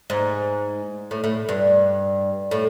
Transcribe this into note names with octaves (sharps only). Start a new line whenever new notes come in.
G#2
A2
A2
G2
A2